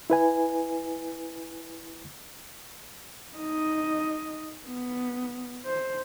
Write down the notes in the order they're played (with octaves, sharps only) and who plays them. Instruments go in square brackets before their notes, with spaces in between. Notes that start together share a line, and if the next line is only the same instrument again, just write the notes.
[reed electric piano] E4 B4 G#5
[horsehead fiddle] D#4 D#5
B3
C5